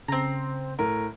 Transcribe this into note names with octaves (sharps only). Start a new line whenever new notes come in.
C#3 C4 A#5
A2 A#4